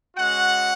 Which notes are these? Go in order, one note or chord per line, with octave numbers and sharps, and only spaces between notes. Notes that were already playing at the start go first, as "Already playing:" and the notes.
G#3 C#4 F#4 F#5